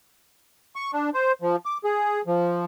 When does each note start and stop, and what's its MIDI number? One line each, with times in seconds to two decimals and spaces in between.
0.76 0.91 85
0.93 1.10 62
1.14 1.32 72
1.42 1.56 53
1.65 1.78 86
1.84 2.22 68
2.27 2.65 53